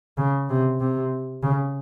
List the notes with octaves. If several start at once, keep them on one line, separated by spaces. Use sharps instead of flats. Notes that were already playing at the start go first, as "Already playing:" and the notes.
C#3
C3
C3
C#3